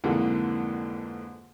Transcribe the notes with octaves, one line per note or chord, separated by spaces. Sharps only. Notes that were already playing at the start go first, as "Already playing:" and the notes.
F2 G#2 D3 E3 A#3